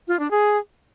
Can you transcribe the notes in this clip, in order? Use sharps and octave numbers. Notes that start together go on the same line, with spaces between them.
F4
D4
G#4